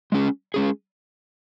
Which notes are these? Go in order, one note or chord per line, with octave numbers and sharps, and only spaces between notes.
G#3 C#4 G#4
G#3 C#4 G#4